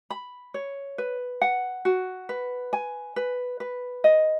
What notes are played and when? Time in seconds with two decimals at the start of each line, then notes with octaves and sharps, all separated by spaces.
0.10 B5
0.54 C#5
0.98 B4
1.42 F#5
1.85 F#4
2.29 B4
2.73 G#5
3.16 B4
3.60 B4
4.04 D#5